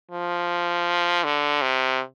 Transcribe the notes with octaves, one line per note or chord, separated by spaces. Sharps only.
F3
D3
C3